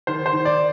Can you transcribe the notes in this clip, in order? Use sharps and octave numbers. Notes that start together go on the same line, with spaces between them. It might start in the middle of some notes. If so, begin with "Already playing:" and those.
D#3 C5
C5
D#3
D5